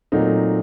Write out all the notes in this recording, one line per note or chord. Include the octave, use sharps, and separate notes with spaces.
A#2 F#3 A3 C4 D#4